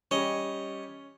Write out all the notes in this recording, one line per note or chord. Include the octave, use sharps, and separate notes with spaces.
G3 C#4 G4 C#5 D#5